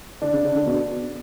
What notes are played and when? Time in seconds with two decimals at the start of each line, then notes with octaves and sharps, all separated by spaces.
0.22 D3 D4
0.33 C#3
0.44 C#3
0.55 D3
0.66 B2